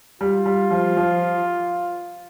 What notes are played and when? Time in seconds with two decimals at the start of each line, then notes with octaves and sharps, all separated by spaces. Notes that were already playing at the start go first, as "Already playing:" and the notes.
0.21 G3 F4
0.46 G3
0.71 F3
0.97 F3